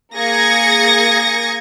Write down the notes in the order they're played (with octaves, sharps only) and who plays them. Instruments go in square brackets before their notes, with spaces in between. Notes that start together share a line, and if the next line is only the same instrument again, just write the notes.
[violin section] A#3 G#4 D#6 G#6 A#6 C#7